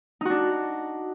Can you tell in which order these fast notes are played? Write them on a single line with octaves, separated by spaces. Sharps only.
D#4 F#4 D4